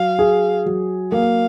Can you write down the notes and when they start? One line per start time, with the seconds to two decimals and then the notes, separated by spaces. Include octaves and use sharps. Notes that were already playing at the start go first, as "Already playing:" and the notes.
Already playing: F#3 F5
0.19 G#4
0.66 F#3
1.12 A#3 F5